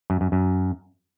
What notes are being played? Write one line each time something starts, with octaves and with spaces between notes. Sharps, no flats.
F#2
F#2
F#2